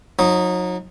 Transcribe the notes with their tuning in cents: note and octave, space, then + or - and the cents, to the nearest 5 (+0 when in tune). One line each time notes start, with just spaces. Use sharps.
F#3 -40 D#4 +0